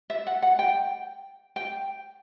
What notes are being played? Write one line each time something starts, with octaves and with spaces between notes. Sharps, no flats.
E5
F#5
F#5
G5
G5